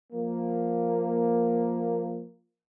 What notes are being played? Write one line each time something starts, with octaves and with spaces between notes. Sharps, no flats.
F3 A#3